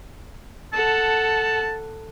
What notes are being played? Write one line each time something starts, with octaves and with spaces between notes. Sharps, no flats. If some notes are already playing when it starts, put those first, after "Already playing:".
A4 F#5 A5